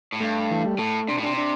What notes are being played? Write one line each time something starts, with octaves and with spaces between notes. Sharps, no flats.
A2
G2 A3
E3
G3
A2 A3
C3 D4
A2
C3 D4
D4